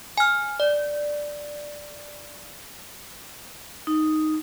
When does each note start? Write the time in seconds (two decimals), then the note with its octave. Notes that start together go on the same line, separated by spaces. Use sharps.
0.18 G#5 F6
0.60 D5
3.87 D#4